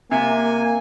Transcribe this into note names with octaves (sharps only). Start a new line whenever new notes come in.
C3 A#3 G#5